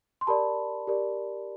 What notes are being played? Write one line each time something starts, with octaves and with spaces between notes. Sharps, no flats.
C6
G4 A#4 D5 A5 B5
G4 A#4 D5